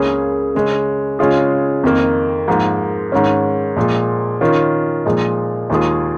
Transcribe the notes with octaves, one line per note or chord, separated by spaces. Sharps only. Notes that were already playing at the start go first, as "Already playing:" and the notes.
Already playing: C#2 C#3 A#3 C#4 G#4
C#3 G#3 C#4
C#3 G#3 C#4 F4 G#4
F2 D#3 A#3
G#2 F3 A#3
G#2 D#3 C#4
A#2 F3 G#3
D#3 C#4 F4
A#2 F3 G#3 D#4
D#2 D#3 G#3 F4 G#4